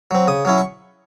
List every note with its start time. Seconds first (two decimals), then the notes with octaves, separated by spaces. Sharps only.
0.11 F#3 C4
0.28 C#3 D#6
0.45 F#3 C#4 E4
0.58 C#6